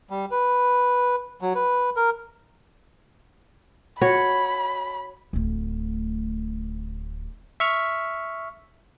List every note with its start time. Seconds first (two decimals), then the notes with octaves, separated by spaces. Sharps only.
0.10 G3
0.31 B4
1.41 F#3
1.55 B4
1.96 A#4
4.01 F#4 C#5 B5
5.33 D1 D2
7.60 E5 C#6 F6